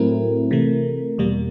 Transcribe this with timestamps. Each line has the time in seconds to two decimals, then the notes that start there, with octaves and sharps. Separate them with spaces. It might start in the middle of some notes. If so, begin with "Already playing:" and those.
Already playing: A2 F#3 A3 C4 E4 A#4
0.51 C3 E3 A3
1.18 E2 B2 G3 A#3